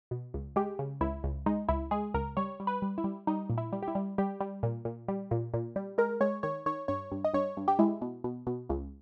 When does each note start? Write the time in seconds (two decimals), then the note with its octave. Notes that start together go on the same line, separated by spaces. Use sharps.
0.11 B2
0.34 C#2
0.56 G#3 G4
0.79 C#3
1.01 C#2 E4
1.24 C#2
1.46 G#3 D#4
1.69 C#2 E4
1.91 G#3 G#4
2.14 C#2 A#4
2.37 G3 C#5
2.60 G3
2.67 B4
2.82 G3
2.98 E4
3.04 G3
3.27 G3 D#4
3.50 A#2
3.58 E4
3.73 G3
3.83 G4
3.88 E4
3.95 G3
4.18 G3 G4
4.40 G3
4.63 A#2
4.85 A#2
5.08 G3
5.31 A#2
5.54 A#2
5.76 G3
5.98 G#3 A#4
6.21 G#3 C#5
6.43 D#3 C#5
6.66 D#3 C#5
6.88 G2 C#5
7.11 G2
7.24 D#5
7.34 G2 C#5
7.57 G2
7.68 G4
7.79 G#3 E4
8.01 B2
8.24 B2
8.47 B2
8.69 C#2